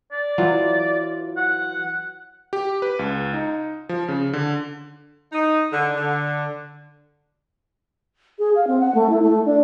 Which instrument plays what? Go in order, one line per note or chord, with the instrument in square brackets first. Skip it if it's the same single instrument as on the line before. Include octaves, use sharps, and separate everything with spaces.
[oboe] D5
[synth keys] E3 F#3 F4
[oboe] F#5
[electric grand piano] G4
B4
C#2
D#4
F3
C#3
D3
[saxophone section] D#4
D3
D3
[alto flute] G#4
F5
C4
F#5
A3
E4
A3
D4